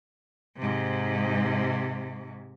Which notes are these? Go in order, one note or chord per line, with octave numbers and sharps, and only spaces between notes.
G#2 C3